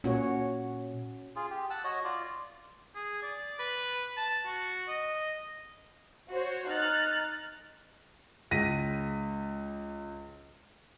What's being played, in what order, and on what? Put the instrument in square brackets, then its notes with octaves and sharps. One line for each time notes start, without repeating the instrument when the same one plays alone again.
[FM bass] A#2 [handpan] C#4 F#4 C#5
[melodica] F4 G#4
G4
F#5 A5 E6
F#4 C#5 D#5
F4 D5
[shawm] G#4
D5
B4
A5
F#4
D#5
[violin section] F#4 C5 C#5
D#4 F6 F#6 A6
[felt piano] C#2 A#6 B6 D#7